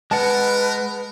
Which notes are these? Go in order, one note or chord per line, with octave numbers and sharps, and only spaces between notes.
G#3 A#4 B4 F#5 A5